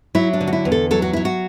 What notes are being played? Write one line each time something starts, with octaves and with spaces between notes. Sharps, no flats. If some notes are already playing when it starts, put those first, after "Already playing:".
F#3 E4
D4
D3
F#4
E4
E2
A4
F#3 A4
F#4
F#3 E4
F#4